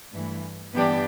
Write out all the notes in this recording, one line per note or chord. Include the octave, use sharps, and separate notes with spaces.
G2 E3 A3
G2 E3 B3 D4 G4